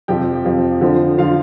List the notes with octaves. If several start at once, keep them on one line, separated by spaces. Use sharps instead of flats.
F2 C3 F3 G4 G5
F2 C3 F3
F2 D3 F3
D3 F3 F4 F5